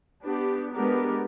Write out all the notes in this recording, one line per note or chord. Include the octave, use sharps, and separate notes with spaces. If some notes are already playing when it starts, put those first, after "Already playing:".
B3 D4 G4
G#3 B3 D4 G4 A#4